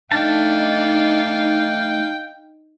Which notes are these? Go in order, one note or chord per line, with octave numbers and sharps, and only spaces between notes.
A3 D4 D#4 F5 G5 A5